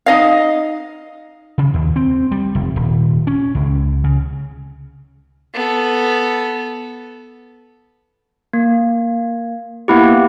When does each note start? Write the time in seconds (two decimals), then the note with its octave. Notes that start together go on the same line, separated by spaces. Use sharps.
0.06 D#4 D#5 F5
1.58 C#3
1.74 D#2
1.96 C4
2.31 G3
2.55 F1
2.76 D#1
3.27 C#4
3.55 C#2
4.04 C#3
5.54 B3 A4
8.53 A#3
9.88 A#3 B3 E4 G4